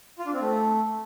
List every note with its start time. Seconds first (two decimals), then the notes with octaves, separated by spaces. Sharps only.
0.19 F4
0.26 D4
0.33 C4
0.41 A3